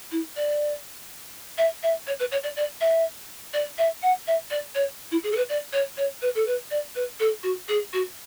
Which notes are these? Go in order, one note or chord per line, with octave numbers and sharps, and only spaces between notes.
E4
D5
E5
E5
C#5
B4
C#5
D5
D5
E5
D5
E5
F#5
E5
D5
C#5
E4
G#4
A4
B4
D5
C#5
C#5
B4
A4
B4
D5
B4
A4
F#4
G#4
F#4